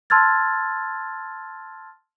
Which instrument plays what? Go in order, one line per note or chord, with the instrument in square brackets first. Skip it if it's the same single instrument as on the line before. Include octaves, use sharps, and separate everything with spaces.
[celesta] A5 C6 E6 F6 G#6 A6